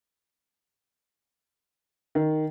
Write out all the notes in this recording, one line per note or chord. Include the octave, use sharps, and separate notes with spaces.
D#3